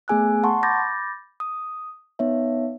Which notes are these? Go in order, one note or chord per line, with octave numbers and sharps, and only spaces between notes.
A3 B3 G#4 G#5 E6 F#6
F#5 A5 C6 C#6
B5 D6 G6 A6 A#6
D#6
B3 D#4 C#5 E5